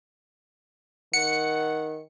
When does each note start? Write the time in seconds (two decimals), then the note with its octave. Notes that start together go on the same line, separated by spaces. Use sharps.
1.13 D#3 F#5 C#7